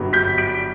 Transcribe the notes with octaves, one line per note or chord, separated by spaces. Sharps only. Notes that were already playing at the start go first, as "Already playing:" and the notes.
Already playing: G1 G2 F#3 B3
G6 B6
B6 D7